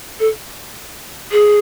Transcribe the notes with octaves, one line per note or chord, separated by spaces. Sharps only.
A4
G#4